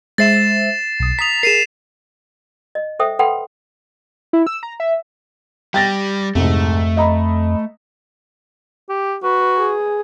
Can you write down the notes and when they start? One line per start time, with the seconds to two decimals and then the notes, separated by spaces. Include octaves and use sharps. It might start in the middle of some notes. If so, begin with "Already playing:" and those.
0.18 G#3 C5 E5 A6 C7 E7
1.00 B1 D#6
1.19 A#5 D#6 B6 F7
1.43 G#4 A#4 C7 D#7 E7
2.75 D#5
2.99 A4 C5 E5 G5 D#6
3.19 A4 B4 F#5 G5 B5 C6
4.33 E4
4.47 E6
4.63 A#5
4.80 E5
5.74 G3 G5 A6 A#6
6.35 C2 F2 G#2 A3
6.97 D#5 A#5 B5
8.89 G4
9.23 F#4 B4
9.56 G#4